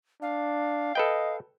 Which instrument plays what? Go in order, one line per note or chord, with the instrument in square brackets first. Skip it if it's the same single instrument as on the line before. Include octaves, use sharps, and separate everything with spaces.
[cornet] D4 [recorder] F5
[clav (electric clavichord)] A4 B4 G5 [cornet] D#5